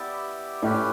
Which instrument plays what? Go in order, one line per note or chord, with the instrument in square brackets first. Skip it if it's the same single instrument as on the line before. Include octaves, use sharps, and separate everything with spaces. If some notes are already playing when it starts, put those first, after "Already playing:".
Already playing: [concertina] B3 E4 G4 D5
[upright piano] A2 [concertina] C#4 G4 B4